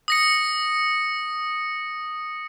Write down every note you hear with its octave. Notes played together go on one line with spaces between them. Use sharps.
D#6 A#6 C#7